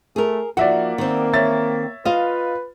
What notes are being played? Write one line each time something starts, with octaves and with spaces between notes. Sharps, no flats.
A3 G#4 A#4
F3 A#3 D#4 F#4 D5 E5 F#5
D#3 C4
C#5 E5 A6
F4 B4 D#5 F5